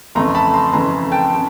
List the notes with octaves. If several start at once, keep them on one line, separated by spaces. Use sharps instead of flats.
F2 C#3 E3 A3 A#5 C6
A5 B5
A#5 C6
F2 C#3 E3 A3 A#5 C6
G5 A5
C#3